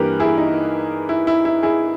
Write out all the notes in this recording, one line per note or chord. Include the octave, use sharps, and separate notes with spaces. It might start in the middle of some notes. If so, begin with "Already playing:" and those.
Already playing: G2 E3 A#3 G4 A#4 B4
E4 G#4
D#4
E4
E4
E4
E4 G#4